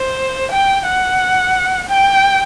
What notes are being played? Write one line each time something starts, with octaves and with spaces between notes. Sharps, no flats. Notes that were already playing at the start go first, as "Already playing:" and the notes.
Already playing: C5
G5
F#5
G5